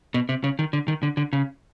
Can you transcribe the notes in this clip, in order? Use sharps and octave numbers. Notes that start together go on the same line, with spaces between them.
B2
C3
C#3
D#3
D3
D#3
D3
D3
C#3